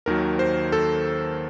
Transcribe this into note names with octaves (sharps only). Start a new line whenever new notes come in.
D#2 D#3 F#3 A#4
C5
A4